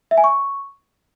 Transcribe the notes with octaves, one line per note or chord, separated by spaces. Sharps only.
E5
G#5
C#6